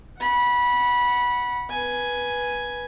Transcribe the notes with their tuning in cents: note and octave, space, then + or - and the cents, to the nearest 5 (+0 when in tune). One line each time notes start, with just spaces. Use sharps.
F#5 +0 B5 -20
B4 -15 G#5 +5